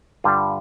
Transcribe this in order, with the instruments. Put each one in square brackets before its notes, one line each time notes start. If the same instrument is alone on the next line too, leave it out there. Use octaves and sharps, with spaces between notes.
[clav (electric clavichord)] G2 D3 G3 F4